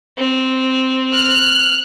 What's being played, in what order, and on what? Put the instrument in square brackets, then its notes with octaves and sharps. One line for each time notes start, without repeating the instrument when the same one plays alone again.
[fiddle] C4
[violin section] F6 F#6